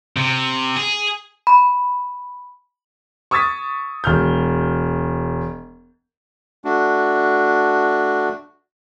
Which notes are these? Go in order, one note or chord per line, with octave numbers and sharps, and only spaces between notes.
C3
G#4
B5
C#6 D#6 E6 G#6 A6 B6
E1 F6 G6
A3 D4 F#4